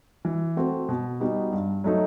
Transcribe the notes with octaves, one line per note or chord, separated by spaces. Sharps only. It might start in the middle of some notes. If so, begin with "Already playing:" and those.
E3
A3 C4 F#4
B2
G3 B3 D#4 F#4
G2
F#3 A3 D#4